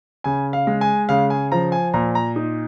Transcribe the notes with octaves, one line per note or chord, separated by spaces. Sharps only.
C#3 G#5
F5
G#3
G#5
C#3 F5
G#5
F3 A#5
G#5
A#2 A#5
A#5
D#4